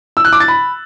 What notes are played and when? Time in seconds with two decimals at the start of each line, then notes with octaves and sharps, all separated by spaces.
0.17 E6
0.25 F#6
0.32 D6
0.40 A6
0.48 B5